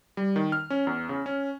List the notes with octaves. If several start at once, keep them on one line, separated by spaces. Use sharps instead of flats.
G3
D#3
F6
C#4
E2
C#3
C#4